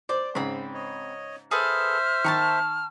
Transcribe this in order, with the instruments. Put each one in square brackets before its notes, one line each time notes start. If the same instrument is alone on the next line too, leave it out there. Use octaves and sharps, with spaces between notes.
[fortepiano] C5 [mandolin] D5
[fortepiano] G#2 C#3 [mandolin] C4 B5
[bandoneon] C#5 D#5
[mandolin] G#4 A4 B4 [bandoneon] C5 E5 [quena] F6
[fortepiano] D#3 [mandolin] A5 A#5 C#6